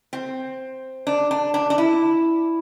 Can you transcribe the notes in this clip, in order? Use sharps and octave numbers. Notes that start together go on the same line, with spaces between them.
C4
D4
D4
D4
D4
E4